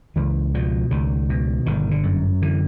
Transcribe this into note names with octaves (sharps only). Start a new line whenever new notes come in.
C#2 E3
B2 F3
C#2 D#3
B2
G1 D#3
D3
F#2
D3 E3